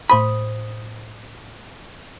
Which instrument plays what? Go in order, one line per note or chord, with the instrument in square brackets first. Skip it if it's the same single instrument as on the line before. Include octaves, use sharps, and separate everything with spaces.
[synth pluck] A2 C5 D#6 [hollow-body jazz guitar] B5